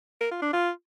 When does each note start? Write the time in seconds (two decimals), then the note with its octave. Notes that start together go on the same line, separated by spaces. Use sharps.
0.20 A#4
0.31 F4
0.42 D4
0.53 F4